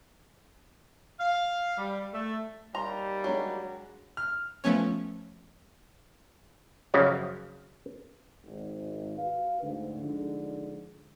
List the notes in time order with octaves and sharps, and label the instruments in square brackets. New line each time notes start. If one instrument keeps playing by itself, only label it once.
[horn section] F5
G3
A3
[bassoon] D#2 [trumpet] G3 [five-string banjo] A#5 [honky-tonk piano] C6
[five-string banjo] F#3 [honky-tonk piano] G#3 D4 F#4
[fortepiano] F6
[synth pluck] F3 A3 B3 C#4 C#5
[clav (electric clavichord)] F#2 C#3 F3 F#3
[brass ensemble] G#1
F#4 B4 F5
D2 G#2 D3
D3 F3 G#3 D4 D#4